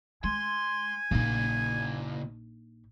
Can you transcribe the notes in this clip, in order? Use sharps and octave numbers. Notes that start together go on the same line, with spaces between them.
G#3 G#5 C6
A#1 C#3 A#3 D#4